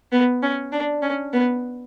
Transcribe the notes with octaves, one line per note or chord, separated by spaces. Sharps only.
B3
C#4
D4
C#4
B3